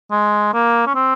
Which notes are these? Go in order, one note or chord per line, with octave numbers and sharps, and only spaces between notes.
G#3
A#3
C#4
C4